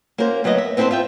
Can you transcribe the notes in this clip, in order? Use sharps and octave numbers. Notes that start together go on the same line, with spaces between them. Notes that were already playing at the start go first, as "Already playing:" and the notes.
A#3 C#4 F#4 A#4 C5
D2 F#3 B3 E4 D#5
E5
B3 C4 E4 F#4 A4 C5
F4 E5 G5